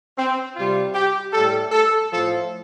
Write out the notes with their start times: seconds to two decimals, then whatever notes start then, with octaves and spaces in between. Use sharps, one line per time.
0.17 C4
0.55 C3 G3 F4
0.94 G4
1.33 A2 G3 A4
1.72 A4
2.10 A2 F3 A4